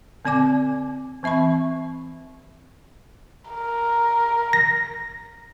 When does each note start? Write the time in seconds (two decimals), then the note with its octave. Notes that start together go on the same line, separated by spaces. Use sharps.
0.25 D3 C4 D5 G#5 D6
1.23 E3 C4 E5 B5 C#6
3.50 A#4
4.53 A#6